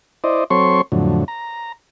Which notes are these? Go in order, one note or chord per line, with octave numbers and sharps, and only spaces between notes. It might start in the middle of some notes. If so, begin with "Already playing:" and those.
E4 C5 D5 D#5
F#3 C4 A4 C#5 C6 C#6
F2 A2 D3 F#3
A#5